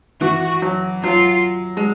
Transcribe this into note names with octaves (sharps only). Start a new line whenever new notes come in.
E3 F#4
F#3
F#3 F4
G#3